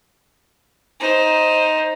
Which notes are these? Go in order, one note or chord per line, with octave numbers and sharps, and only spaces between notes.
D#4 C5